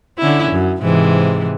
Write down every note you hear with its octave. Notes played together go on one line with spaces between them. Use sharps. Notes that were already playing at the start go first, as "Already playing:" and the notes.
D3 C#4 E4
F#2
G#2 C3 E3